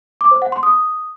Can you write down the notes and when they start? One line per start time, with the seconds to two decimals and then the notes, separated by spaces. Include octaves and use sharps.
0.21 D6
0.31 C5
0.42 F#5
0.52 C6
0.63 D#6